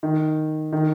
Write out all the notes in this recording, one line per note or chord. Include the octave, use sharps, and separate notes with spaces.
D#3
D#3